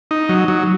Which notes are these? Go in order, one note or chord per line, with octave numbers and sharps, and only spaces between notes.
D#4
F#3
F#3